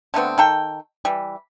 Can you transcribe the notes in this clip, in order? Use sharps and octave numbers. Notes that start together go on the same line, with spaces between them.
D3 A3 B3 C4
D#3 A4 G5
E3 G3